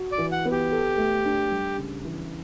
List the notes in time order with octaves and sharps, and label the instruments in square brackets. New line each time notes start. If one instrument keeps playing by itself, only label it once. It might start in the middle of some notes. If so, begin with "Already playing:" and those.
Already playing: [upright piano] F#4
[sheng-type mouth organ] D5
[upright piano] E3
[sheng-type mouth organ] F#5
[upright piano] B3
[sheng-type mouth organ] G4
[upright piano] A4
A3
D4
G3
C#3
E3